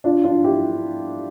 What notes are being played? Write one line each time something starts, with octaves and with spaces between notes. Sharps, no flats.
D4 F4
D4 F4
E4 G4